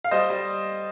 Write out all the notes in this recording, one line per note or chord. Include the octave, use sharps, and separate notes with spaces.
F5
G3 C5 D#5
G3